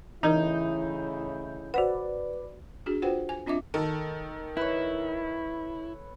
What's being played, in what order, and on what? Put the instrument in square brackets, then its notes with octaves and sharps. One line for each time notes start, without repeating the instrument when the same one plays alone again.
[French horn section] A2 C#3 E4 [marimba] E3 A#4 [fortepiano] D#4 [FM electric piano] G6
[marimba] F#4 C5 F#5 [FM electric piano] B4 D5
[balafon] D4 F#4 G#4
F4 F#4 B4 C5 F#5 G5
G#5
C4 D4 F4 D#5 E5 D6
[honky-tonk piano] D#3 [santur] A4
[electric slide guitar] E4 [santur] B4 C#5